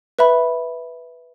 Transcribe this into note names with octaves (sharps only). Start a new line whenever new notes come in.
B4 E5 B5